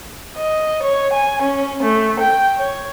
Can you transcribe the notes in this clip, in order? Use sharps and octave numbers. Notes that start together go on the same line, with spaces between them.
D#5
C#5
G#5
C#4
A3
G5
C#5